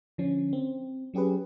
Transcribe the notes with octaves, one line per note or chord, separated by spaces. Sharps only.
D3 F3 C#4
C4
F#3 C#4 G4 G#4 B4